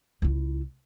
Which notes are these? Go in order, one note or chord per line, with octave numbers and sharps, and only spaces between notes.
C#2 E4